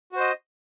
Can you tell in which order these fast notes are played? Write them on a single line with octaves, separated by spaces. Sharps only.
F#4 C5 D#5